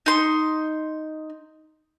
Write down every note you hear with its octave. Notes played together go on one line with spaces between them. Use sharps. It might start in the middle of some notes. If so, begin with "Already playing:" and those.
D#4 C6